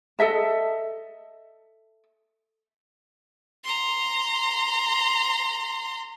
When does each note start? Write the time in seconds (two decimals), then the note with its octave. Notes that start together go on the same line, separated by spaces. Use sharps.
0.19 A4 D#5 E5 A5
3.64 A#5 C6